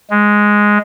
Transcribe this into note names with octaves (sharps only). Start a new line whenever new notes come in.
G#3